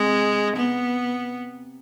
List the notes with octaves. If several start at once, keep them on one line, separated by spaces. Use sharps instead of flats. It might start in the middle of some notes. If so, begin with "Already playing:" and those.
Already playing: C3 G#3
B3